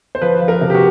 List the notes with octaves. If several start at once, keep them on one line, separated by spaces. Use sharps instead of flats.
C5
F3 B4
F3
A#4
C3
G4
F#4